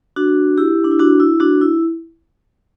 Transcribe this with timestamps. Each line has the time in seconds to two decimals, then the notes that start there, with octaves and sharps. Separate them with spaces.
0.16 D4 F#4
0.58 E4 G4
0.84 D4
0.91 E4
0.99 D4 F#4
1.20 E4
1.40 D4 F#4
1.61 E4